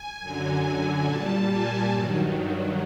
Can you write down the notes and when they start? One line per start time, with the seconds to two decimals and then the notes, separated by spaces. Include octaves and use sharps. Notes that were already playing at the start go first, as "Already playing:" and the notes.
Already playing: G#5
0.20 F#2 D3 F#3
1.04 A#2 G3 A5
1.47 G#5
1.89 G2 D#3 F#3